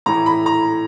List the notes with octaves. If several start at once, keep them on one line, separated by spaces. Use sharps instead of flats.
A2 E3 A#5
B5
A#5